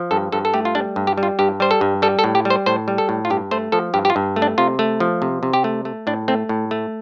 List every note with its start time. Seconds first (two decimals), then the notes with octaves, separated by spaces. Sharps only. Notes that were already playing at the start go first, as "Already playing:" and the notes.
Already playing: F3
0.11 G2 A4
0.32 G2 A4
0.45 A4
0.54 A3 G4
0.65 F4
0.75 G3 D4
0.96 G2
1.07 G4
1.18 G3
1.23 F4
1.39 G2 G4
1.60 G3 C5
1.71 A4
1.81 G2
2.02 G3 A4
2.19 A4
2.24 A2
2.35 G4
2.45 G3
2.50 C5
2.66 A2 C5
2.88 G3
2.98 A4
3.09 A2
3.25 F4
3.30 G2 G4
3.51 A3 C5
3.72 F3 A4
3.94 G2 G4
4.05 G4
4.10 F4
4.16 G2
4.36 A3
4.42 D4
4.58 C3 F4
4.79 A3
5.00 F3
5.22 C3
5.43 C3
5.53 G4
5.64 A3
5.85 A3
6.07 A2 D4
6.28 A3 C4
6.49 A2
6.71 A3